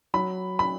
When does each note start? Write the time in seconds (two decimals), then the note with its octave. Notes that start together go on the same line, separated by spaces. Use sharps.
0.14 F#3 B5
0.59 B5